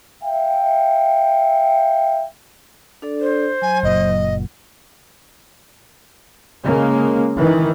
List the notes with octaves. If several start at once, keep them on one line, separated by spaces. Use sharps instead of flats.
E5 F5 G5
D4 A4 D5
C5
F#3 G#5
F#1 A#2 D#5
C#3 G#3 A#3
D#3 E3